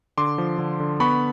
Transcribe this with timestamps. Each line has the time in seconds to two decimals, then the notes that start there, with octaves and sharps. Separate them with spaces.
0.18 D3 C6 D6
0.38 F3
0.59 D3
0.80 D3
1.00 B3 B5 C#6